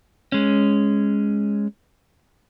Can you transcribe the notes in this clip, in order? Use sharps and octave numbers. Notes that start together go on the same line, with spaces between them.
G#3 C#4